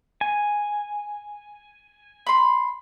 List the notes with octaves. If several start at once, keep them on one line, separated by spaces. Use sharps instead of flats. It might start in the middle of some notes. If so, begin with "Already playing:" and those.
G#5
B5 C6